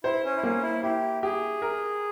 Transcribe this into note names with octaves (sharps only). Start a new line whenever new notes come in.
E4 C5
C#4
E4
A#3 C#4
E4
E4 G4
G4 G#4
A#4